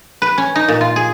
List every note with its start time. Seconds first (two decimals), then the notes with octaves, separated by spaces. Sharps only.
0.22 B4
0.38 C#4
0.56 D#4
0.68 A#2
0.81 F4
0.96 G#4